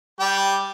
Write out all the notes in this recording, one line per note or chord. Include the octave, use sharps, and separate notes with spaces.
G3 G4